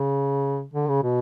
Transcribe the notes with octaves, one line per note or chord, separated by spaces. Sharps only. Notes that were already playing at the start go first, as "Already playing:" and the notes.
Already playing: C#3
D3
C#3
B2